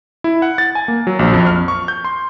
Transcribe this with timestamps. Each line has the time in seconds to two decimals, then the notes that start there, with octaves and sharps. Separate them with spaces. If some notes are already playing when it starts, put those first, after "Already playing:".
0.24 E4
0.42 F#5
0.58 A6
0.75 G#5
0.88 A#3
1.07 F#3
1.19 A#1
1.33 F2
1.47 F6
1.68 C#6
1.88 G6
2.05 C6